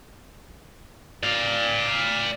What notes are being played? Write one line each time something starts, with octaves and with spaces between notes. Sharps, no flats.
D5 F5